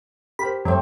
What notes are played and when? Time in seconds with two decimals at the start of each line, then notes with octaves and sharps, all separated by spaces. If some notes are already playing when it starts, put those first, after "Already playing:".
0.39 G4 A#4 C5 B5
0.65 F#2 G3 A3 C4